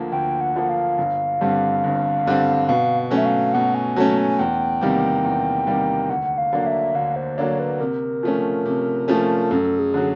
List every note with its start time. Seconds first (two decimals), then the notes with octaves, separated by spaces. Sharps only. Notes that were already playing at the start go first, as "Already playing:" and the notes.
Already playing: D2 D3 F3 A#3
0.12 D2 G5
0.41 F#5
0.56 D3 F3 A#3
0.69 F5
0.98 G1
1.41 G2 D3 G3 C4
1.84 G1
2.26 G2 D3 G3 C4
2.68 B2 F5
3.11 F#3 A3 C#4
3.17 E5
3.26 F5
3.53 B2 F#5
3.75 G#5
3.96 F#3 A3 C#4 A5
4.18 G#5
4.39 E2 G5
4.81 C3 D#3 G3 A#3
5.24 E2
5.67 C3 D#3 G3 A#3
6.10 D2 F#5
6.38 F5
6.53 D3 F#3 A#3 D4
6.67 E5
6.95 D2 F5
7.16 C5
7.38 D3 F#3 A#3 D4 C#5
7.60 B4
7.80 C3 A#4
8.23 F3 A3 C#4
8.66 C3
9.08 F3 A3 C#4
9.50 F#2 A4
9.79 G#4
9.94 D3 F#3